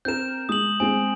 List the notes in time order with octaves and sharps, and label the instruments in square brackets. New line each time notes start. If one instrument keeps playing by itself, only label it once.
[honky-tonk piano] C4 A#4 [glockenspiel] G6 E7
[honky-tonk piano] G#3 [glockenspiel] D#6 F#7
[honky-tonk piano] G#3 C4 [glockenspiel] G#5